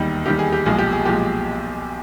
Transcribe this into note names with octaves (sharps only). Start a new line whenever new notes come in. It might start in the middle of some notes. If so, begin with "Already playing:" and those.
Already playing: E1 D#2 D#3 G3
E1 D#2 D#3 G3 G4
G#4
G4
B1 A#2 F3 G#3 G#4
G4
G#4
B1 A#2 F3 G#3 G4